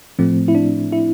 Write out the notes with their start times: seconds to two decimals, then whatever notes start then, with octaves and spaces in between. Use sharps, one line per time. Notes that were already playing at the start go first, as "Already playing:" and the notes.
0.19 A2 F3 A3 C4
0.48 E4
0.55 D4
0.92 E4